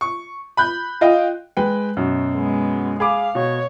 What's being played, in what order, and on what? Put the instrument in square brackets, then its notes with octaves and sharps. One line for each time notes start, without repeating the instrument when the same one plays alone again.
[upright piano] C#6
B5 F#6 G6
F4 D#5 G5
G#3 B4 G5
F#2 B2
[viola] G#3 B3
[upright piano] G#4 B5 D6 [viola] F5
[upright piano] B2 [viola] C#5